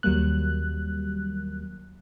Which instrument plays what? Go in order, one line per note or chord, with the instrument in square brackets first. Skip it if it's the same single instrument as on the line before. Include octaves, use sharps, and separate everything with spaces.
[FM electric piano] D#2 F#3 G3 A#3 F#6